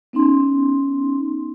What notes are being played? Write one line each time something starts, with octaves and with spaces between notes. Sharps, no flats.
B3 C#4 D#4 C6